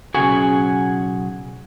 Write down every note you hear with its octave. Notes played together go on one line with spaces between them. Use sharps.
B1 C#3 F#4 G#4 F#5 G#5